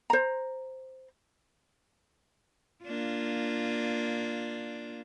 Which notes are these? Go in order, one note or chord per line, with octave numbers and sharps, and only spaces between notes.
C5 A#5
A#3 D4 F4